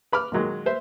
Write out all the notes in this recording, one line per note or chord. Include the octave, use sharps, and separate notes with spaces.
B4 B5 D6 F6
A#2 D#3 F#3 G#3
B4 C5 E5